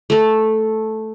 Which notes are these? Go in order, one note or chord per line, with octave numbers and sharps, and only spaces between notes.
A3 A4